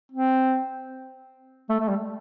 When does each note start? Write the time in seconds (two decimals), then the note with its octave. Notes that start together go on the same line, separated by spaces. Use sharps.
0.12 C4
1.69 A3
1.80 A3
1.89 G3